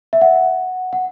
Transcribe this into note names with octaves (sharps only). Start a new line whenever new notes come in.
E5
F#5
F#5